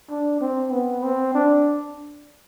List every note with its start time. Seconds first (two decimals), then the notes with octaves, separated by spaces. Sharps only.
0.10 D4
0.41 C4
0.72 B3
1.03 C4
1.35 D4